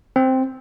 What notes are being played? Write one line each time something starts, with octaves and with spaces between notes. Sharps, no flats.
C4